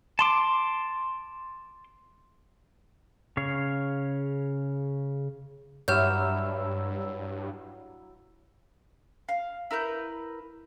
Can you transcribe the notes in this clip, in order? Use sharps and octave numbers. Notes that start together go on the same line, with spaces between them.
A5 C6 D6
C#3 C#5 F5
G2 F#3 E4 G4 C#5 E6 F6 G6
F5
E4 A#4 B4 G6